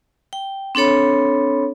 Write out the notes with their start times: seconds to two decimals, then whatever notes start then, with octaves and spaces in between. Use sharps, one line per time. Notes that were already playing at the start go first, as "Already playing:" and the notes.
0.33 G5
0.75 C4 D4 A4 C#5 B5